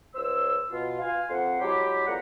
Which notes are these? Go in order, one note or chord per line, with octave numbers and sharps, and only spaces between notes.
C#2 C5 C#5 E6
B2 F4
F4 F5 G#5
F2 F#5 C6
F#3 G#3 E4 G4
F2 A#3 C5 D5 F#5 A#5